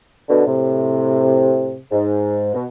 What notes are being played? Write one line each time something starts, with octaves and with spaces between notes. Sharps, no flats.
B2 D3
A2 C3
G#2
B2